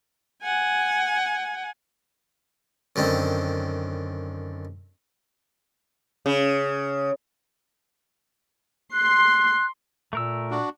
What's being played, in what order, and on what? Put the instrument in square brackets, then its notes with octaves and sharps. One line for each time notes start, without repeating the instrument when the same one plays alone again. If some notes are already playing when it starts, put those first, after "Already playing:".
[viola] F#5 G#5
[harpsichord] F#2 D3 D#3 C4
[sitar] C#3
[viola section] C6 [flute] F#6
[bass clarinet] A#2 [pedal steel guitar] A3 A#4 E6
[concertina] D4 F#4